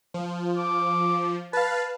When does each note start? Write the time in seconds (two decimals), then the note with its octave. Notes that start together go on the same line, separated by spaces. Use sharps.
0.14 F3
0.57 D6
1.53 B4 F5 A5